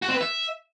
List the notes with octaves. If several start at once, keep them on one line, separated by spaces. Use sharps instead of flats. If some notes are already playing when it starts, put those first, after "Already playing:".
F#4
C4
B4
E5